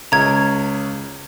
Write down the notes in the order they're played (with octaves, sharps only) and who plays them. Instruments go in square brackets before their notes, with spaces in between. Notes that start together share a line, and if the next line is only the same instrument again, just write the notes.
[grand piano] C#2 C#4 [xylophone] A#5 G#6